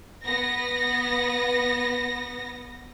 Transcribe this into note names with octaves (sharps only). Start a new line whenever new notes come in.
B3 A#6